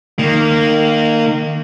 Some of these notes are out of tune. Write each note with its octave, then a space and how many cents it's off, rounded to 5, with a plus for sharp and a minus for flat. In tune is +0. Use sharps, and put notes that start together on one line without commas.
D#3 -25 A#3 -20